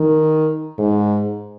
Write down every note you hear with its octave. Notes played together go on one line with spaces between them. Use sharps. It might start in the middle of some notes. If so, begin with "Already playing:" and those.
Already playing: D#3
G#2